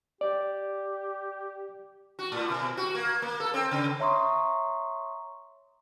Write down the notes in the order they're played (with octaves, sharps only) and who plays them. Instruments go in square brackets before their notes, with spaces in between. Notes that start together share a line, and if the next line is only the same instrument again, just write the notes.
[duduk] G4 [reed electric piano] D5
[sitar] F#4
A2
B2
F#4
A#3
A#3
A4
C4
C#3
[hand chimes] C#5 E5 A#5 C6 C#6 D#6